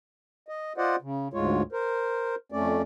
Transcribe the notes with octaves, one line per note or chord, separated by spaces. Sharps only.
D#5
F4 C5 D5 D#5 F#5
C#3
D2 G#2 G#3 F4 C#5
A#4 C5
F2 A3 C#4 D5